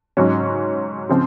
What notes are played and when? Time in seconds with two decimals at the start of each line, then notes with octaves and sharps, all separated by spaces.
0.17 G#2 F#3 C#4
1.09 C#3 F3 C4